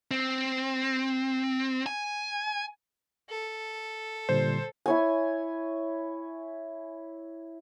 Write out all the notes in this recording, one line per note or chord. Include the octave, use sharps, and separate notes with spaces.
C4
G#5
A4
A#2 D3 G3 C5
E4 C#5 G#5